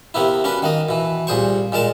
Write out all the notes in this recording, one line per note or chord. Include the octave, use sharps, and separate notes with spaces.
C3 A#3 B3 E4
C#4 D4 F#4 B4
D#3 A#3 D#5
B2 E3
C2 A#2 G#4 C5 C#6
A#2 G#3 A#4 A5